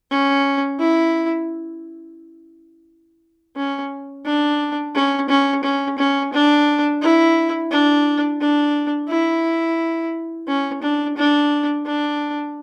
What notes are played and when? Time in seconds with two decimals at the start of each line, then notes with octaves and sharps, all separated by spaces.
0.11 C#4
0.79 E4
3.56 C#4
4.25 D4
4.95 C#4
5.29 C#4
5.64 C#4
5.98 C#4
6.33 D4
7.02 E4
7.71 D4
8.41 D4
9.09 E4
10.47 C#4
10.82 D4
11.17 D4
11.85 D4